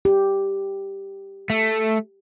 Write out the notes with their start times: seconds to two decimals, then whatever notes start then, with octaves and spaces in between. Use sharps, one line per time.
0.05 G4
1.50 A3